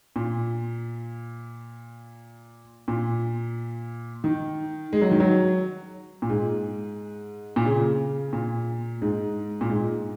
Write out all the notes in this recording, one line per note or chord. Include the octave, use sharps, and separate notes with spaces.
A#2
A#2
D#3
G#3
F#3
D#3
F#3
A#2
G#2
A#2
C#3
A#2
G#2
A#2
G#2